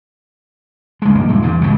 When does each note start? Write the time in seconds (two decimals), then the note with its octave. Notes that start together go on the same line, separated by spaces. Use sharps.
1.02 C#2 G#3
1.15 F1 G2 D#3 A#3
1.29 D#1 C3 G#3
1.42 E2 G2 C3
1.62 G#1 C#2 G2 C#3